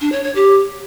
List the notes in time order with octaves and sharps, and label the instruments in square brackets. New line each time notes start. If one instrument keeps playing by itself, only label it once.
[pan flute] D4
C#5
C#5
G4